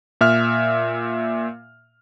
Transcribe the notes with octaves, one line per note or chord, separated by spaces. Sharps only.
A#2 E5 F6